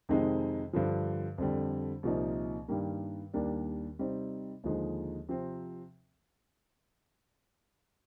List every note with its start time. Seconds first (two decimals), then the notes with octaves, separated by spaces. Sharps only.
0.09 F2 C3 D#3 G#3 D#4
0.73 G2 D3 F3
1.38 F2 D3 G3
2.03 C2 A#2 F3 A#3 D#4
2.68 G2 D#3 G3 A#3
3.34 D#2 D#3 G3 A#3 D4
3.99 C3 G3 C4 D#4
4.64 D#2 D3 F3 G#3 D#4
5.29 C3 F3 C4